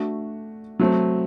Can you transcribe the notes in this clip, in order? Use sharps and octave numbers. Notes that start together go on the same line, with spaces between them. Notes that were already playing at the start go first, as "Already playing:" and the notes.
Already playing: A3 D4 F#4
F#3 A3 C4